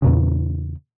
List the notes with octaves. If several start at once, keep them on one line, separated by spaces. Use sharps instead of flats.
E2 A#2 C#3